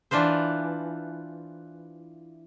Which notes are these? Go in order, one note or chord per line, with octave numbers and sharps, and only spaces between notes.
E3 D4 F4 B4 C5